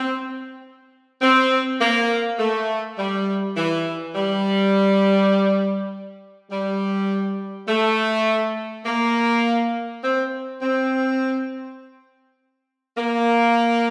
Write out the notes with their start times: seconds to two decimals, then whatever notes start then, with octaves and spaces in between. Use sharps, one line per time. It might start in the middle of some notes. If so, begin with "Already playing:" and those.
Already playing: C4
1.22 C4
1.80 A#3
2.39 A3
2.98 G3
3.56 E3
4.15 G3
6.51 G3
7.68 A3
8.86 A#3
10.03 C4
10.62 C4
12.97 A#3